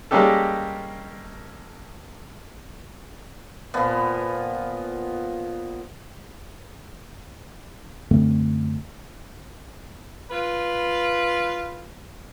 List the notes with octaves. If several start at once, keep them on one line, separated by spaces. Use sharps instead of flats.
G3 G#3 A#3 C#4 G4 A4
A#2 F3 B3
F#2 D3 A3 C4
F4 B4